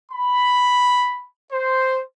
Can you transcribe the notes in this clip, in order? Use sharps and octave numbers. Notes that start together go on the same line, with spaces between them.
B5
C5